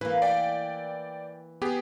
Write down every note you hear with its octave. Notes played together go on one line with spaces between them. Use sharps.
E3 A#3 B4
D5 G5
B3 G4 G#4